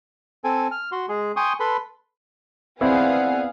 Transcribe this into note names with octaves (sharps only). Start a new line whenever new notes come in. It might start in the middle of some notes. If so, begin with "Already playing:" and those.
C4 A4 G#5
F6
F#4 C6
G#3 G#4
G5 G#5 C6 C#6 D#6
A4 B4 B5 C6
B3 C4 E4 G#4 D5 F5 F#5